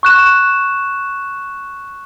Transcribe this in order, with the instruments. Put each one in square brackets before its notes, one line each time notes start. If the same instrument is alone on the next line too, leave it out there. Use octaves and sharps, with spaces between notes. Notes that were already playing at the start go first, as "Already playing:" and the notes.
[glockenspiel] C#6 F#6 E7